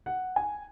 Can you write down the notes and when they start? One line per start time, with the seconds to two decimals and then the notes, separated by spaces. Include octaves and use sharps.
0.06 F#5
0.36 G#5